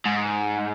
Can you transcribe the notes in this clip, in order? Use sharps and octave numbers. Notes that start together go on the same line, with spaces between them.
G#2